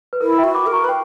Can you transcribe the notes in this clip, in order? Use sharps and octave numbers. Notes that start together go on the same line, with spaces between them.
B4
E4 A#4
E5 G5
F#4
B5 D6
A#4
A#5 C#6
B4
G5